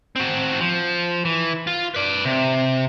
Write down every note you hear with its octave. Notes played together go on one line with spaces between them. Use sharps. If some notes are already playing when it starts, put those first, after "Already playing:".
C4 F#4
F3
E3
F4
B4 D5
C3